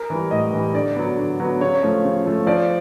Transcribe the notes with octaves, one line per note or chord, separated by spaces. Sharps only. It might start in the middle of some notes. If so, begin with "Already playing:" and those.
Already playing: A#4
E3 G3
A2 D#5
E3 G3
D3 D5
F#3 B3
D3
F#3 B3
C#3 C#5
F3 A3
C#3
F3 A3
F3 D5